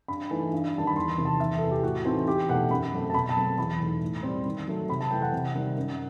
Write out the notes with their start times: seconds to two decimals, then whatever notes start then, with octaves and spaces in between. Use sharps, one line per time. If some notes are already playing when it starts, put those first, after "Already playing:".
0.08 G2 B5
0.31 E3 A3 D#4
0.53 G2
0.74 D#3 G3 A5
0.87 B5
0.96 E2 C6
1.18 C3 D#3
1.25 A5
1.40 E2 E5
1.58 C3 E3 A4
1.71 G4
1.83 A2 F#4
2.05 E3 A3 C4 D#4
2.27 E2 G4
2.50 B2 A3 D#4 F#5
2.70 F#2 B5
2.92 F#3 A3 C4
3.10 A5
3.14 B2 B5
3.29 A5
3.37 F#3 A3 C4
3.58 E2 B5
3.80 B2 A3 D#4
4.02 A2
4.23 G3 C4
4.45 D#3
4.68 F#3 A3
4.89 C3 B5
5.01 A5
5.11 E3 A3 G5
5.22 F#5
5.32 C3
5.55 D#3 G3 D#4
5.77 F#2